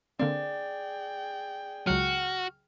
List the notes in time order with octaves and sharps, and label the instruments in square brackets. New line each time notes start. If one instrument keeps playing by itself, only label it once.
[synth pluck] D3 A#3 C4 [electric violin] G#4 G5 [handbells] D5
[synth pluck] C#2 F#3 [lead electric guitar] F#4 [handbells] F6